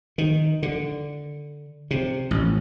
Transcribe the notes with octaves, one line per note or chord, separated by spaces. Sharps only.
D#3
D3
C3
A1